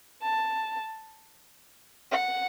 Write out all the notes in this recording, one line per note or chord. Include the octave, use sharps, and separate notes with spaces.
A5
F#5